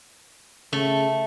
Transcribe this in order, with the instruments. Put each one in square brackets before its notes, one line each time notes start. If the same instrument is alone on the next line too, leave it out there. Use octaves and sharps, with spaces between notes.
[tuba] C#3 [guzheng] A3